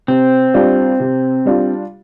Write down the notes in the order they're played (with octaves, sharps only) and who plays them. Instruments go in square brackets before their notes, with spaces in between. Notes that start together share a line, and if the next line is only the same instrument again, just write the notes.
[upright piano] C3 [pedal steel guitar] C4
[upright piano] G3 D4 F4
C3
G3 D4 F4